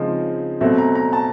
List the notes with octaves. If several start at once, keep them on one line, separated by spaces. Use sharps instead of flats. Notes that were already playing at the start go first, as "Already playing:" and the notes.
Already playing: C#3 F3 G#3 C4 D#4
B2 F#3 A3 C4 E5
A#5
A#5
A5